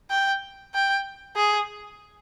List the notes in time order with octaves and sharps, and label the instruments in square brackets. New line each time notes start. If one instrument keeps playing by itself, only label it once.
[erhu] G5
G5
G#4